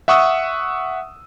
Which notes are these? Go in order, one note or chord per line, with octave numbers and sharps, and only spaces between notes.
E5 F#5 C#6 D#6 E6